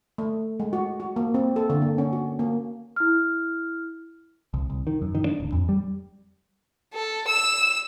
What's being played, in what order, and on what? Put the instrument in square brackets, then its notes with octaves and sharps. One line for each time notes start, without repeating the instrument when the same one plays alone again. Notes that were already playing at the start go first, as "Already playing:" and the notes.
[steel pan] A3
G#3
F#4
F#4
A#3
C4
A4
D3
A#3
C#4
F#4
A#3
[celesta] E4 F6
[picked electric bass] C2
C2
D#3
F#2
D#3
D4
D1
F2
G3
[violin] A4
E6 E7